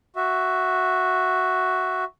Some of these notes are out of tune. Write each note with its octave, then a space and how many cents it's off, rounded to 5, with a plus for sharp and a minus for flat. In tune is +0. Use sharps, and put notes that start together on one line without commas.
F#4 +0 E5 +0